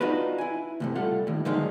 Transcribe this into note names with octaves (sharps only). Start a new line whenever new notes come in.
D4 D#4 F4 F#4 B4
E4 G#5
C#2 A2 C3
G3 F4 A4 F#5
D#2 A2
D3 D#3 F3 F#3 G#3 D#4